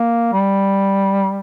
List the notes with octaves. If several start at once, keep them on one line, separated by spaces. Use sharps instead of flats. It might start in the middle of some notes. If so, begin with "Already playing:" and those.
Already playing: A#3
G3